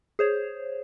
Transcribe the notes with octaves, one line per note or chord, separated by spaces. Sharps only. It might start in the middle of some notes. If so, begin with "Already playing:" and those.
G#4 C5 C#5